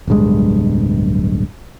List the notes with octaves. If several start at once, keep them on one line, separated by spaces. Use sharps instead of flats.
D1 B1 G2 G#3